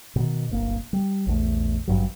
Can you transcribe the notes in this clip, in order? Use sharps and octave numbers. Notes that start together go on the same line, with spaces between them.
B2 D#3
D1 G1 A#3
G3
A#1 E2 A3
G#1 G2 F#3